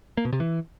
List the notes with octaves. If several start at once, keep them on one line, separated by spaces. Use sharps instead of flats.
A#3
B2
C3
E3